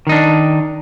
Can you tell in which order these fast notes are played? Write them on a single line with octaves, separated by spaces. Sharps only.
D#3 D#4 D4